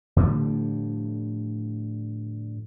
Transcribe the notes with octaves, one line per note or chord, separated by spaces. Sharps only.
A2 D3 F3 G3